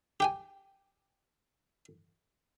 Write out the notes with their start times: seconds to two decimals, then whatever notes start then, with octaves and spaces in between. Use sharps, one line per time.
0.20 G4 G5 G#5